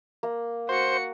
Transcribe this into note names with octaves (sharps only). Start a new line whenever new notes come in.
A#3
F#4 C5 C#7